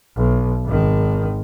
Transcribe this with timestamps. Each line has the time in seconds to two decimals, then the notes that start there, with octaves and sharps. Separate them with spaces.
0.16 B1
0.65 G#1 D#3